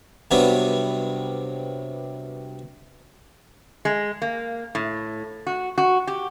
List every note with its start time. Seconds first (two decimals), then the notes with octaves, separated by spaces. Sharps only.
0.31 G2 C3 F#3 G3 B3
3.85 G#3
4.22 A#3
4.75 A2
5.47 F#4
5.78 F#4
6.07 G4